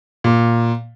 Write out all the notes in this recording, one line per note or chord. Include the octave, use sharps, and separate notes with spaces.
A#2